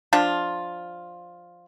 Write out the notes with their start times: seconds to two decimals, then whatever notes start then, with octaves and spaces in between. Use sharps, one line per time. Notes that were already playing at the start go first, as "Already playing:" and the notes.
0.13 F3 D4 F4